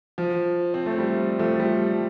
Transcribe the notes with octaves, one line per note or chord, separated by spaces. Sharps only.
F3
C4
A3
G3
F3 A3
G3